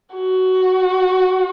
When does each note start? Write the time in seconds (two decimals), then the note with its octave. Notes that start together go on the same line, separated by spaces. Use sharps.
0.16 F#4